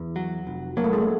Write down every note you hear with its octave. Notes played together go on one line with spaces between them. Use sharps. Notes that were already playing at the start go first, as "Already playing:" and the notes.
Already playing: E2
F#3
F1
F#3 A#3
A3
G#3
A3